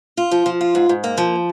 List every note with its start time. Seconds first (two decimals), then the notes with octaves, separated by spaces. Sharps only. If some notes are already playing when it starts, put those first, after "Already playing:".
0.17 F4
0.31 F3
0.46 F3
0.61 F4
0.75 G#2
0.89 G#2
1.04 A#3
1.17 F3